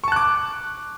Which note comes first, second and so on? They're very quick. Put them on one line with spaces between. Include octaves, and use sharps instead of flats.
C#6 A5 F#6 D6